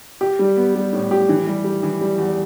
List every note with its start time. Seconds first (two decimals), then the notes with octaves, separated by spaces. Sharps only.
0.21 G4
0.39 G3
0.56 B3
0.75 G3
0.93 A2
1.11 G4
1.29 E3
1.47 G3
1.64 G3
1.83 E3
2.01 G3
2.18 E2